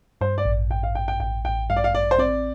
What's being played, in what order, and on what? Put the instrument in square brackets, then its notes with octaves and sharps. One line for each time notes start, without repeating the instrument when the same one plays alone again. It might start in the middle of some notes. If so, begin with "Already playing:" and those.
[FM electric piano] G2 [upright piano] C5
[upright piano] D5
[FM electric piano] A1
[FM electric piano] A1 [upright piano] G5
[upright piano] F5
[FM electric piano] A1 [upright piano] G5
[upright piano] G5
[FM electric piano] A1 [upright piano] G5
[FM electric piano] A1 [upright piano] G5
[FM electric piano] G2 [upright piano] F5
[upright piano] D5
F5
[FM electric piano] A1 [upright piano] D5
[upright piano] C5
[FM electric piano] C4 [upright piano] D5